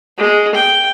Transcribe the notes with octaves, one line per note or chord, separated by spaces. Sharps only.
G#3
G5